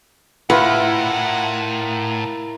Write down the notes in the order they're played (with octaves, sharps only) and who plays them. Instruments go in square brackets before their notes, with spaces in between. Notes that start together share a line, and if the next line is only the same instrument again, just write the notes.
[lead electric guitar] A2 [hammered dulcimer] E4 F4 A#4 [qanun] B4 [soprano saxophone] F#5